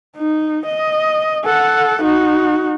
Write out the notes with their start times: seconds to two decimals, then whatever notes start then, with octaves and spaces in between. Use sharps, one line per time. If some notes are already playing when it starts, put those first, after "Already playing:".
0.17 D#4
0.66 D#5
1.44 A4 F#5
2.01 D#4 F#4